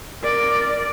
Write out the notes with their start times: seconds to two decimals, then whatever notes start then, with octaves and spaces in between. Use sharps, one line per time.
0.22 A#4 D5